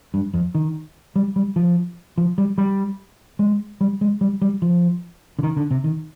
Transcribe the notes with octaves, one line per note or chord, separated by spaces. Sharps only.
G2
F2
D#3
G3
G3
F3
F3
G3
G3
G#3
G3
G#3
G3
G3
F3
D3
D#3
D3
C3
D#3